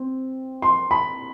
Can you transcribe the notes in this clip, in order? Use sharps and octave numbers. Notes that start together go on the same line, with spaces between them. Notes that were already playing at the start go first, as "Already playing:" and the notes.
Already playing: C4
C6
B5